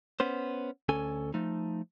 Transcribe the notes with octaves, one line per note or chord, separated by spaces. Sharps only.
B3 C#4 C5
D2 C#4 A4 G#5
F3 A3 D#4